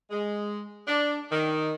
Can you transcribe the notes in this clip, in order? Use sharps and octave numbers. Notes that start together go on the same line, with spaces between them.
G#3
D4
D#3